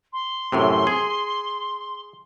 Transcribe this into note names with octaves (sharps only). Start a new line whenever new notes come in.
C6
F#2 A2 C3
G#4